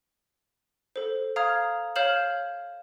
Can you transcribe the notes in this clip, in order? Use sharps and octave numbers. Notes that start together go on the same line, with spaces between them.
A4 C5
F5 A#5 D#6 F6 G#6
C#5 F5 F6 G6 E7 F#7